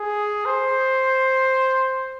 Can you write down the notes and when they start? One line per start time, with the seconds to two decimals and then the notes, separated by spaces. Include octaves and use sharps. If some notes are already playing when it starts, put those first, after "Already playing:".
Already playing: G#4
0.45 C5